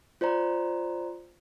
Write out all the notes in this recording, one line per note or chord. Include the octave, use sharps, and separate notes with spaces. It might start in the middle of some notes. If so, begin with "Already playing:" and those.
F4 C5 D5 A#5